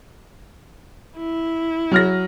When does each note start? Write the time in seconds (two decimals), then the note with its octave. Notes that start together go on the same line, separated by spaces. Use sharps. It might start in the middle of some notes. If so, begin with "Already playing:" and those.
1.18 E4
1.91 F#3 F6 A#6